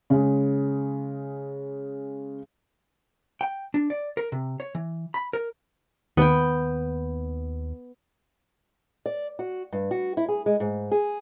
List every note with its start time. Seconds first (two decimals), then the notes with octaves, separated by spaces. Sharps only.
0.10 C#3 G#3
3.41 G5
3.74 D4
3.90 D5
4.17 A#4
4.32 C3
4.60 C#5
4.75 E3
5.14 B5
5.33 A#4
6.17 D#2 B3 G5
9.06 D5
9.39 F#4
9.73 G2
9.91 F#4
10.17 E4
10.29 G#4
10.46 G#3
10.60 G#2
10.92 G#4